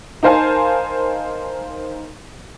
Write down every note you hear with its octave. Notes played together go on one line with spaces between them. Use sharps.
D#4 A#4 C5 F5 G#5 A5